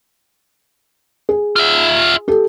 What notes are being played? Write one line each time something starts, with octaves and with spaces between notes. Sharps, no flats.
G#4
F4 E5
G4 A4